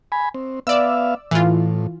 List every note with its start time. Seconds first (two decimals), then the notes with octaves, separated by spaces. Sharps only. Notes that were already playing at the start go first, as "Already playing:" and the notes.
0.12 G#5 B5
0.34 C4
0.67 B3 D5 E5 F5 E6
1.31 A2 E3 F4